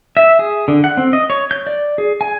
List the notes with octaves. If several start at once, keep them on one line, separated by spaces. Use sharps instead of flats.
E5
G#4
D3
F#5
C4
D#5
C#5
G6
D5
G#4
G#5